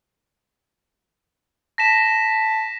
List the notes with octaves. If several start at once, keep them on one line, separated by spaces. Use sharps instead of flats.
A5 A#6 B6 E7